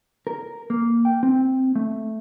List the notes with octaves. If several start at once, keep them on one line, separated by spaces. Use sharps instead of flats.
A#4
A#3
G5
C4
A3